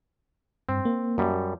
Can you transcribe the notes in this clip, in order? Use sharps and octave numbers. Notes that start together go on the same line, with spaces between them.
G2 C4
A#3
F#2 G3